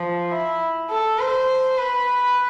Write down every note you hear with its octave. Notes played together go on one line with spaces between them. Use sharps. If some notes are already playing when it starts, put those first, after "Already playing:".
Already playing: F3
E4
A4
C5
B4